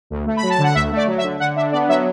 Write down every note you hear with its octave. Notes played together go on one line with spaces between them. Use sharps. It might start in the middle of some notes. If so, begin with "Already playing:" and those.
D2
A3
B5
F#3
A5
D3 F#5
D2 E5
A3 D5
F#3
E5
D3
D3 F#5
D4 E5
B3 D5
F#3 E5